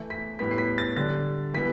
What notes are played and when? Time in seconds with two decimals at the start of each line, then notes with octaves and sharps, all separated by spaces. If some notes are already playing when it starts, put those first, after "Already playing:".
Already playing: E3 A3 E4
0.10 B6
0.39 A2 G3 B3 B6
0.51 C7
0.58 B6
0.78 A6
0.96 D3 G3 D4 A6
1.54 E3 G3 B3 B6